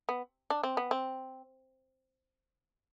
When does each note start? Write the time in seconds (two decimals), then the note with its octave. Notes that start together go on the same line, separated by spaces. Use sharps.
0.09 B3
0.50 D4
0.63 C4
0.77 B3
0.91 C4